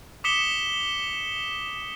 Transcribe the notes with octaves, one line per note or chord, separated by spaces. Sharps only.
D6 D#6 B6 C#7 E7 G7